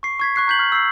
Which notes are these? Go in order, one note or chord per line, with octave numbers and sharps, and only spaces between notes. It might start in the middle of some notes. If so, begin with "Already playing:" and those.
C#6 C7
C#6 G#6 B6
C#6 F#6 C7
A#5 F#6 G6 B6 F#7
F6
E6 G6 C7